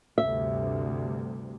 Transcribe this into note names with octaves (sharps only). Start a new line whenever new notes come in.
D2 G2 C3 E5